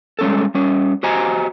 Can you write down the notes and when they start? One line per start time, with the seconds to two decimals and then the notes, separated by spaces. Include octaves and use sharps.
0.19 G3 G#3 C#4 G#4 A4
0.55 G3 C#4
1.03 F#4 G4 C5 D#5 G#5 A#5